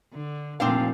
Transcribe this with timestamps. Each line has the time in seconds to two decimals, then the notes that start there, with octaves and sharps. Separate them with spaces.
0.13 D3
0.60 F1 A#2 F3 C4 D4 F5